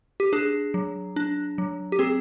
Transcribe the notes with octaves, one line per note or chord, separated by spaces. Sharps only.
G4
D4 G#4
F#3
D4
F#3
G4
C4 G#4